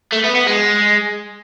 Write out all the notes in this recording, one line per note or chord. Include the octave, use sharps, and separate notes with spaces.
A3
B3
B3
G#3